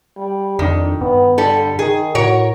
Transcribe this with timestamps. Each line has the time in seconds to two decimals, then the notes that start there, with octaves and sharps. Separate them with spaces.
0.17 G3
0.59 F2 D#3 D4
1.01 G2 B3
1.38 D3 G3 A4
1.79 D#3 G#4
2.15 A2 F#4 A#4 C#5